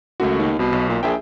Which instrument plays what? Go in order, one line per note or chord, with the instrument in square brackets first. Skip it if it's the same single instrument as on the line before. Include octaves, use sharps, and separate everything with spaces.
[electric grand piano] C#2 A3 F#4 [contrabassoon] F#2
[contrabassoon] D#2
[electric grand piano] C2 [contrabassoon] B2
[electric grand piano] B1
[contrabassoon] A#2
[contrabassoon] A#1 [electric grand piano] G#4 E5 G5